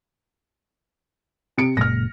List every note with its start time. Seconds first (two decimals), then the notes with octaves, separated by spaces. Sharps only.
1.58 C3 C#7 D7
1.77 F#1 A#2 G#3 F6 A#6